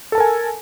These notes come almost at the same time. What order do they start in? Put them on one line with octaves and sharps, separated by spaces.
A4 A5 A#4 G#5